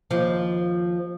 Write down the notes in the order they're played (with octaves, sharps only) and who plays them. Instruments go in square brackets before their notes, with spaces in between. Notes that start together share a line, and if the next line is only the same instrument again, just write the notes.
[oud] D#2 F3